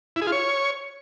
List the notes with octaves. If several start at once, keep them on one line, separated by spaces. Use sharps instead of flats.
E4
G#4
F4
C#5